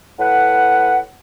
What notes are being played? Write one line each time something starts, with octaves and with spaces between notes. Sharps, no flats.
A2 B4 F#5